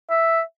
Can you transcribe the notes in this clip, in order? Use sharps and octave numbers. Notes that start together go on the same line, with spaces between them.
E5